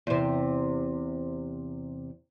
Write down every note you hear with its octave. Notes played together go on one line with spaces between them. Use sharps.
E2 C3